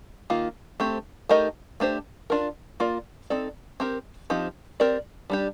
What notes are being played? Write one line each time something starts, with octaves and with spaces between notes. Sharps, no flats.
D#3 A#3 F4
A3 C4 G4
A3 D#4 G4 A#4 D#5
A3 D4 G4 C5
D4 F4 A#4
A#3 F4 A#4 D5
C4 D#4 A4 D5
C4 G4 A#4
F3 C4 D#4 G4
C4 G4 A#4 D5
G3 D4 G4